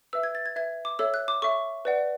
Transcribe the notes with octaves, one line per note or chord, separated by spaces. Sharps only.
B4 E5 E6
G#6
A6
G#6
B4 E5 G#6
D6
A4 C#5 E5 E6
F#6
D6
A4 C#5 E5 C#6
B4 D5 F#5